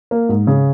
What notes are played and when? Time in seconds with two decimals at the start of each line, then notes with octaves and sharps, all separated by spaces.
0.11 A#3
0.29 G#2
0.47 C#3